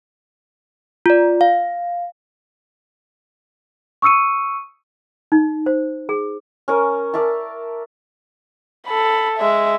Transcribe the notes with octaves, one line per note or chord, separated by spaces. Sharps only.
F4 D5
F5
C#6 D#6 E6 C#7 D#7
D#4
C5
G#4
C#4 A#4
A#4 D5 E5 A5
A4 B5
G#3 E5